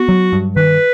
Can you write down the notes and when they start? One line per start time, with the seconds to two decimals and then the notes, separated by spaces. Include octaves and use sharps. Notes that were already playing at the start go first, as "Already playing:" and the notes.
Already playing: B3 F#4
0.09 F#3
0.33 G2
0.56 D#3 B4